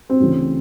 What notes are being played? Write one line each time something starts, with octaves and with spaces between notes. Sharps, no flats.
C4
D2 C#3 E3